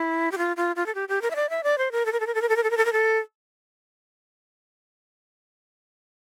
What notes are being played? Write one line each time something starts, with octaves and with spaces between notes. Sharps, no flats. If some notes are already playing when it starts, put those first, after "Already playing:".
Already playing: E4
G4
F4
F4
F4
A4
G4
G4
A#4
E5
D5
E5
D5
C5
A#4
A4
A#4
A4
A#4
A4
A#4
A4
A#4
A4
A#4
A4
A#4
A4